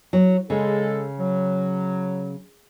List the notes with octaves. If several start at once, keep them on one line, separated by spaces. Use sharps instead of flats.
F#3
C#3 G#3 A4
F#3